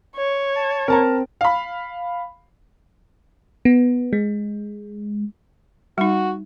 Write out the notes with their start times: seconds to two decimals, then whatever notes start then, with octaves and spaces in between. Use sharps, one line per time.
0.17 C#5
0.56 A5
0.88 C4 A#4 A5 A#5
1.41 F5 B5
3.65 B3
4.13 G#3
5.98 G3 D#4 F#4